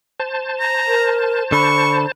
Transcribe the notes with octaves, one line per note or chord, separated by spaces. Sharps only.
C5 A5
A#5
A#4
D3 B5 C#6